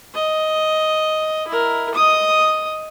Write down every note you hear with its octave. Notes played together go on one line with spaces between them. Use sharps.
D#5
E4 A#4
D#5 D#6